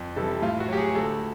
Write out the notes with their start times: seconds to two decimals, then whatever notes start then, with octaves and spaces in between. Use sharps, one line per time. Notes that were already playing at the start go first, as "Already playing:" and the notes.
Already playing: F2
0.16 C3 E3 G3 A4
0.42 A2 F4
0.60 F#4
0.68 F#3 G4
0.77 G#4
0.95 D2 A4